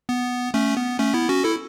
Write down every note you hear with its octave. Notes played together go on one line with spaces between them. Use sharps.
B3
A3 C#4
B3
A3 C#4
B3 E4
C#4 F#4
E4 A4